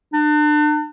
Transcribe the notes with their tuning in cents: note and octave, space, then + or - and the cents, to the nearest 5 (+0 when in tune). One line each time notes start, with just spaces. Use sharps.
D4 +40